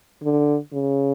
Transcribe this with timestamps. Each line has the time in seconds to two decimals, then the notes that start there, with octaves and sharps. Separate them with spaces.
0.23 D3
0.72 C#3